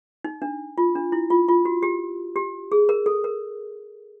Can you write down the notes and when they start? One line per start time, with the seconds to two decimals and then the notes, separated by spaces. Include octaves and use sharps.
0.24 D#4
0.42 D4
0.78 F4
0.95 D4
1.12 E4
1.30 F4
1.48 F4
1.65 F#4
1.83 G4
2.36 G4
2.72 G#4
2.89 A#4
3.06 A4
3.24 A#4